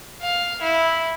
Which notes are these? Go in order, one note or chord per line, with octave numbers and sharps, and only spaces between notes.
F5
E4